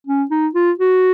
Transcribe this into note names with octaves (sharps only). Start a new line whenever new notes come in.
C#4
D#4
F4
F#4